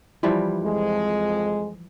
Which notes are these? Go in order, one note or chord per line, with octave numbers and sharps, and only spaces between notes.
E3 F3 G3
F2 G#3